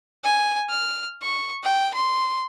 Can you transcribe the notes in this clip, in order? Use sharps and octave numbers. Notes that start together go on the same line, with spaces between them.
G#5
F6
C#6
G5
C6